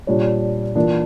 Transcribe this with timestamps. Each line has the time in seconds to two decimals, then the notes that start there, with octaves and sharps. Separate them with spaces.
0.07 A#2 G3 D4 F4 C#5
0.75 E3 A#3 D4 F4